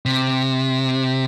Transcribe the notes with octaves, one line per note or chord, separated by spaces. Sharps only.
C3